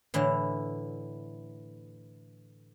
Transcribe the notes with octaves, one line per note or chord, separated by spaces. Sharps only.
A2 D3 E3